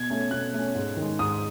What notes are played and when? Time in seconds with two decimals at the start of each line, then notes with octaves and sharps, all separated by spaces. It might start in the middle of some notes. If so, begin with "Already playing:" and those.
Already playing: B2 G#6
0.10 A3 C#4
0.31 B2 F#6
0.54 A3 C#4
0.75 G#2
0.97 D#3
1.02 G#3
1.19 G#2 D#6